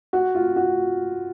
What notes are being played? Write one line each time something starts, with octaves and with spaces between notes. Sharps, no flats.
F#4
F4
F#4